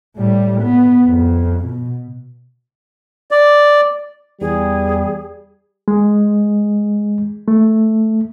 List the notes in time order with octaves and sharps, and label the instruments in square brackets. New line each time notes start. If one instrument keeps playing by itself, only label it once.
[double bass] A2 G3
B3
F2
B2
[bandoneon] D5
[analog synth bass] E2 [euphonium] G3 [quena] G#4
[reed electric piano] G#3
A3